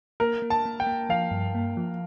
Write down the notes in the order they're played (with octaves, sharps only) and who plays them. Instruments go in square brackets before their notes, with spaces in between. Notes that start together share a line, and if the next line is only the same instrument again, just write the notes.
[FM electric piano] A#3 [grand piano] A#4
[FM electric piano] A#3
[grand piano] A5
[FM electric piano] A#3
[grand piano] G5
[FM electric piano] A#3
[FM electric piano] F3 [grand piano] F5
[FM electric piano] G2
A#3
F3